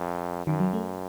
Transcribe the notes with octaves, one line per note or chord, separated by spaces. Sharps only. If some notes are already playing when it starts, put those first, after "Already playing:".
Already playing: F2
F#2 D#3
F#3
A3